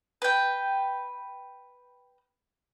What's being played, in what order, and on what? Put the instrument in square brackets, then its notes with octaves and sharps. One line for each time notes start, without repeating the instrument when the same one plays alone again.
[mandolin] B4 G5